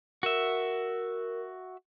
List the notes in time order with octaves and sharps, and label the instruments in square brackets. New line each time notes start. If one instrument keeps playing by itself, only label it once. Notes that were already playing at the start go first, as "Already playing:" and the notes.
[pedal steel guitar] F#4 E5 [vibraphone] A#4